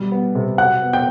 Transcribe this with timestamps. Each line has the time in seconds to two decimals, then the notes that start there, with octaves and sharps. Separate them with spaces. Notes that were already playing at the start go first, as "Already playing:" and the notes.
Already playing: B2 G3
0.12 B3
0.35 C3
0.58 F#3 F#5 F#6
0.82 B3
0.93 G5 G6